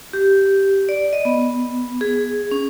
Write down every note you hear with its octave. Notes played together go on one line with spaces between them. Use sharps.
G4
D5
D#5
B3
G#4
C#4